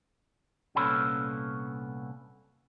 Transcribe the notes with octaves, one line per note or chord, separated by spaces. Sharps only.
C2 A#2 B3 C#4 A4 B5